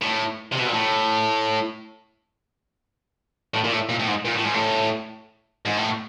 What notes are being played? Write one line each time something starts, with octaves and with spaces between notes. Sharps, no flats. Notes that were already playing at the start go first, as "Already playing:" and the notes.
A2
C3
B2
A#2
A2
A2
A#2
A2
A#2
A2
G#2
A#2
A2
G#2
A2
G#2
A2